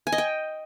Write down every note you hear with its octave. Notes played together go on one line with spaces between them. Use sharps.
G#5
D#5
G5